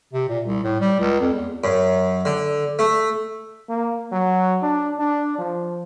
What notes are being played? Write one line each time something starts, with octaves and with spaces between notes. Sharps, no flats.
C3
A#2
C2
A2
G3
C#2
F2
E2
F#2
D3
A3
A#3
F#3
D4
D4
F3